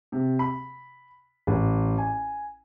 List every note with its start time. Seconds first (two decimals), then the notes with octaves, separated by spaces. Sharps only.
0.12 C3
0.39 B5
1.47 A1
1.98 G#5